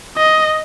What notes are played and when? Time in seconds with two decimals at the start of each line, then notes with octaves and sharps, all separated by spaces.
0.17 D#5